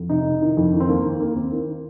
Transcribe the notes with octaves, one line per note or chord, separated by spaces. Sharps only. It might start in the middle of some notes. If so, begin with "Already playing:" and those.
Already playing: F2
C3 D#4
C3
D#3
F2
D#3
C4
D#2 A#3
D#2
D#3 A#3
D#2 C4
D#3
D#3